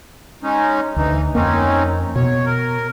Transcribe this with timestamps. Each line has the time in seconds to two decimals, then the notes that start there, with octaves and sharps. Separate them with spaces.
0.43 G#3 C#4 D#4
0.96 D2 E3 D#4
1.35 F2 A#3 C4 C#4 D#4
2.16 B2 C#5
2.46 A#4